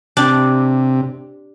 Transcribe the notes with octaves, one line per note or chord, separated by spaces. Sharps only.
C3 D4 G4